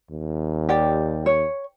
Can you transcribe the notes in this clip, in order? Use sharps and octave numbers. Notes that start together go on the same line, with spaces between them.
D#2
G4 D5 G5
C#5